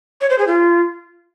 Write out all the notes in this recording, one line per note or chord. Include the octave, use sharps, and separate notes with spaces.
C#5
C5
G#4
F4